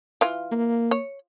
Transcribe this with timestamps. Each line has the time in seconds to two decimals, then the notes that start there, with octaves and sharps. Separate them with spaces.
0.21 E3 F4
0.52 A#3
0.91 C#5